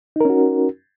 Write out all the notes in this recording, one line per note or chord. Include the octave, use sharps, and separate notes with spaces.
C#4 D#4 F#4 A#4